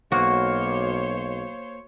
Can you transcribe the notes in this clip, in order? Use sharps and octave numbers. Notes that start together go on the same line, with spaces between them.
B1 A#3 F#4 C5 C#5